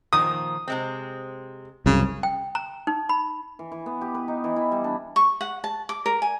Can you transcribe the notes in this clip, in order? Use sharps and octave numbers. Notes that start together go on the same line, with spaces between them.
A#2 D#3 F3 D#6
C3 G#3 C4
C2 F#2 C#3
G5
A#5
D#4
B5
E3
E3
B3
G4
B4
D#4
E3
E4
G3
D4
C#6
F#5
A5
D6
A#4
G#5